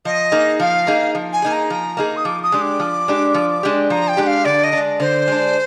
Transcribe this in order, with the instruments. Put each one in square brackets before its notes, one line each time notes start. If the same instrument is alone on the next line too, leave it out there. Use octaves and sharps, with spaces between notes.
[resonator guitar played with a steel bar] F3 [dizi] D#5
[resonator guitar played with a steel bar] A#3 D#4 G#4
[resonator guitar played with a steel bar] F3 [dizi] F5
[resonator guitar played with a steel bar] A#3 D#4 G#4
F3
[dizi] G#5
[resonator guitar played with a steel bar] A#3 D#4 G#4
[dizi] A#5
[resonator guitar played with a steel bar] F3
A#3 D#4 G#4
[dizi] D#6
[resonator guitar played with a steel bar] F3 [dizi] D6
[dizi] D#6
[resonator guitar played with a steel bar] G#3 D4 G4
[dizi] D6
[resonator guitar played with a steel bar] F3
G#3 D4 G4
F3
G#3 D4 G4
[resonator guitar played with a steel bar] F3 [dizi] A#5
[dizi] G5
[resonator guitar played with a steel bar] G#3 D4 G4
[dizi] F5
[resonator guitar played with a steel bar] D3 [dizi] D5
[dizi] D#5
[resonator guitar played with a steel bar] G#3 D4
[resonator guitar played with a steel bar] D3 [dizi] C5
[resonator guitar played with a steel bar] G#3 D4